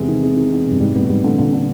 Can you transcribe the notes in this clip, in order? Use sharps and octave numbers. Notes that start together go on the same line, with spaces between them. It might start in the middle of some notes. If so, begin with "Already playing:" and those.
Already playing: E2 C3 G#3
D#3
G#3
D#3
E2
C3
G2
G#2 G3
G#2 B3
A2
G#2 G3
A2 D3
A#2 D3
D3